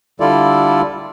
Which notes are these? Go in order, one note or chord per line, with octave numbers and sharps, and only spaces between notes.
D3 G3 E4 F4 A4 D5